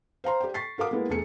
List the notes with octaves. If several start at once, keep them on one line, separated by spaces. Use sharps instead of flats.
C5 F5 A#5 C6
G4 D5 G5
C#6 A6 B6 C7
F#4 A#4 F5 D6 D#6
G#3 A#3 B3 E4 A#4
E1 A3 G#4 C#7